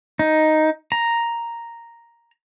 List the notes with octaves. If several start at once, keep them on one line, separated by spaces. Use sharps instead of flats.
D#4
A#5